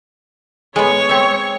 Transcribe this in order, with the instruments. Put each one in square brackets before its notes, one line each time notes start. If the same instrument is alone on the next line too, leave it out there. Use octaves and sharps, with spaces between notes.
[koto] G#3 B3 [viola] C#5 C#6
[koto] C4 E5